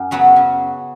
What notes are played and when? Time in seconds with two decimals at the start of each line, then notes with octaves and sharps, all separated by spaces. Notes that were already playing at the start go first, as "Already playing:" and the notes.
Already playing: F#2
0.11 C#3 F#3 B3 F#4
0.36 C#3